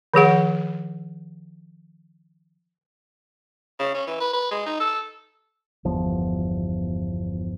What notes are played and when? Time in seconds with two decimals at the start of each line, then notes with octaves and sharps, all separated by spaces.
0.14 D#3 F3 G#4 F#5
3.80 C#3
3.95 C#4
4.07 E3
4.20 B4
4.33 B4
4.51 G#3
4.66 D#4
4.80 A4
5.85 G1 E2 F3